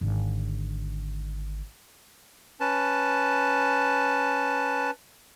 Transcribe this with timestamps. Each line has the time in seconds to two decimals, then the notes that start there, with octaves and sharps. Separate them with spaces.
0.01 G#1 D3
2.60 C#4 B4 A5